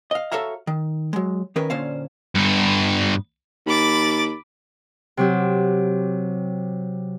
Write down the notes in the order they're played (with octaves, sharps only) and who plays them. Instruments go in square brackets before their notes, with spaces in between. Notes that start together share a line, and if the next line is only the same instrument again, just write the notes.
[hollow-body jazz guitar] D#5 F5
F#4 A4 C#5 E5 F5 A#5
D#3
F#3 G#3
D#3 C#4 A#4 B4
A#2 D3 C#4 C5 F5
[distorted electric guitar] G2 B3
[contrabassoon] D#2 [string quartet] B5 D6 A6
[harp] C3 F#3 G4